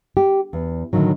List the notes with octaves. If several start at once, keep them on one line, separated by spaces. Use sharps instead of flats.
G4
E2
A2 D3 D#3 F#3